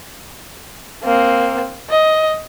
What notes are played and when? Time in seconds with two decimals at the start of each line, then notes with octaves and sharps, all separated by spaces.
1.04 A#3 C4
1.90 D#5